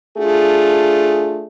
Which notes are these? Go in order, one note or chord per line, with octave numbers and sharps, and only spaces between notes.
A3 D4 F4 G#4